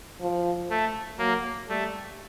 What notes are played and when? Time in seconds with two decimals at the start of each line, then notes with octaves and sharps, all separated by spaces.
0.21 F3
0.70 A3
1.18 F#3 A#3
1.68 G3 A3